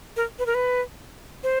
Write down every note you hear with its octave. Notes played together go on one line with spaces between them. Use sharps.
A#4
B4
A#4
B4
C5